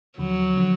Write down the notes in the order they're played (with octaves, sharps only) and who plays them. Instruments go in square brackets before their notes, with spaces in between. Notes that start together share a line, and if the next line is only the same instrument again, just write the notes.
[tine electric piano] D#2 D3 F3 [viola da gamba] F#3
[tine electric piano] D3 F3